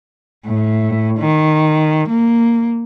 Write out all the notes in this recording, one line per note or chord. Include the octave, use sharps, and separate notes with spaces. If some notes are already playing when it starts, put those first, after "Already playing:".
A2
D#3
A#3